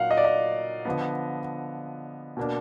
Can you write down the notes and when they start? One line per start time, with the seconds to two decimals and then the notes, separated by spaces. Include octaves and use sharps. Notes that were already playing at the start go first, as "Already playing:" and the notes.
Already playing: A#2 F#3 A#3 D#4 F5 F#5
0.11 D#5
0.17 D5
0.24 D#5
0.85 D3 F3 B3
2.37 B2 A#3 D4